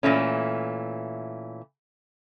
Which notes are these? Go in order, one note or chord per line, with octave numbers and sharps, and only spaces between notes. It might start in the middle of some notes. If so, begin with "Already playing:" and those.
A#2 E3 A3 C#4